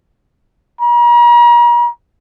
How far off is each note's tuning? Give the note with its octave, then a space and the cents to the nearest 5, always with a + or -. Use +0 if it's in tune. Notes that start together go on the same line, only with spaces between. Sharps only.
A#5 +40